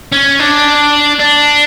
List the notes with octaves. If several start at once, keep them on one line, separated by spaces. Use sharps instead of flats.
C#4
D4
D4